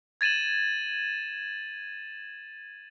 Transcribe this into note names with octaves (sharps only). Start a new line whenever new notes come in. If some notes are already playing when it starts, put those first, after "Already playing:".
G#6 A6 D#7 E7 F#7